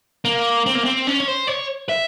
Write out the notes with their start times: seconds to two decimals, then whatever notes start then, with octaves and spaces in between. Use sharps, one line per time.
0.25 A#3
0.66 C4
0.75 A#3
0.84 C4
1.07 C#4
1.20 C#5
1.28 C5
1.47 C#5
1.89 E5